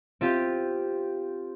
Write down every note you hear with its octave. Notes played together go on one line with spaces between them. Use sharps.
C4 F4 G4